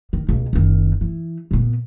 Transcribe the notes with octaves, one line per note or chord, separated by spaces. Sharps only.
D#3
C#2 B2
F#1 D#3
E3
A#2 B3